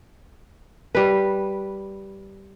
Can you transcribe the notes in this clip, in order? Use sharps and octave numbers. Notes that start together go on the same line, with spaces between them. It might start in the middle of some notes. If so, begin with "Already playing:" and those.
G3 B4